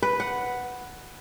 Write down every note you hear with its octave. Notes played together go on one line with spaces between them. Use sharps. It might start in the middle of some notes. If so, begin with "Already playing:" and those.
B4
F#5